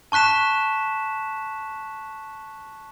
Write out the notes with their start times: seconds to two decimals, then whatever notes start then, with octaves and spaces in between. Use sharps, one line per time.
0.12 A5 C#6 F#6 B6 E7